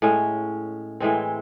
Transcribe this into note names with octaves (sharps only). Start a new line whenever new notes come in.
A2 G#3 C#4
A2 E3 G#3 C4